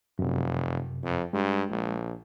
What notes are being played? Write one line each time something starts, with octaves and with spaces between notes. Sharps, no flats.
F1 F#2 C3
F2
G2 G#3
A#1